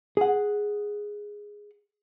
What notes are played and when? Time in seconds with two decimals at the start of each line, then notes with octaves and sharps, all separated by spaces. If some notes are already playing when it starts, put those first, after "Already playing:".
0.17 G#4 F#5